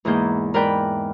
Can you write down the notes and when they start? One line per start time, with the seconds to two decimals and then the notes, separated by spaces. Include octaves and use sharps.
0.05 E2 G#2 E3 A#3 G#4 G6
0.54 G#2 A#4 B4 D5 G5 B5